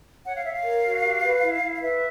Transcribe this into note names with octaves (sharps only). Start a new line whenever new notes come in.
C#5 F#5
F5
C#5 E5
F5
A#4
F#4
G4
B4
E4
E4
F5
B4 E5